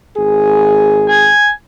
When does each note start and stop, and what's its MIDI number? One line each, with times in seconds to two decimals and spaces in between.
0.16 1.30 32
0.16 1.30 68
1.08 1.49 80